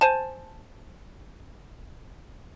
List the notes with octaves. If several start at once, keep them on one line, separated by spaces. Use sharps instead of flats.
C5 G#5 A5